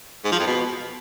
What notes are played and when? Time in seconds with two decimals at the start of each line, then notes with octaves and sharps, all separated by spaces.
0.24 G#2
0.32 F3
0.39 F2
0.47 B2